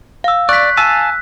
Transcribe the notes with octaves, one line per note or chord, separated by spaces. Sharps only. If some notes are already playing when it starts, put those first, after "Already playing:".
F5 E6
D5 C#6 F#6 B6
F5 G#5 A5 E6